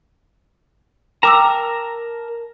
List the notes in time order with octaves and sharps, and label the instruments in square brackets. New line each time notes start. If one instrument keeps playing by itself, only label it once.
[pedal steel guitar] A#4 A5 A#5 [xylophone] G5 D6 E6